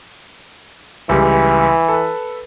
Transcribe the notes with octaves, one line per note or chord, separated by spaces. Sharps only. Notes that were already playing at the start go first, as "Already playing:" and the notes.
C#2 E3 G3
A4 B4